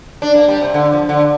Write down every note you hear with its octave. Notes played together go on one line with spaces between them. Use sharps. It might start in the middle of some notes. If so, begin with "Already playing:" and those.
D4
A#3
G3
C3
D3
F3
D3